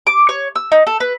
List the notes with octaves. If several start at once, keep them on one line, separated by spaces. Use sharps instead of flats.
D6
C#5
E6
D#4
A4
B4